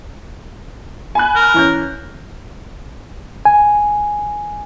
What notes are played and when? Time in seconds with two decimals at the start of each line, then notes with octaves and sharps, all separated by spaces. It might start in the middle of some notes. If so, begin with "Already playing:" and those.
1.15 G#5 B5 F#6
1.36 A#4
1.54 E3 C#4 G6
3.45 G#5